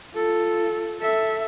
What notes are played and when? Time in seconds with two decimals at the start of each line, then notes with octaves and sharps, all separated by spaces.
0.15 F4 A4
1.00 A4 E5